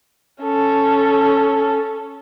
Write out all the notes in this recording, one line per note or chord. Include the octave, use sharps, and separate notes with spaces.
C#4 A4